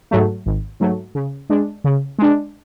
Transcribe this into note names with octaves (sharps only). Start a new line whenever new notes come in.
G#2 F#3 A3
G#1
G#2 F#3 A3
C#3
G#3 D4
C#3
G#3 D4